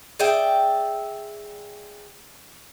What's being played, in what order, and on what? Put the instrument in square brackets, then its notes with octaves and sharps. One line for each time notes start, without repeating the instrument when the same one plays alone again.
[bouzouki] G#4 D5 E5 G5